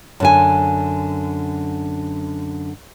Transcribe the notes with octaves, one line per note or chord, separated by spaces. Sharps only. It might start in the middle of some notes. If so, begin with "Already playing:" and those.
F#2 D3 G#5